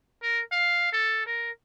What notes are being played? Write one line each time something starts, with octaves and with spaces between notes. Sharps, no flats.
A#4
F5
A4
A#4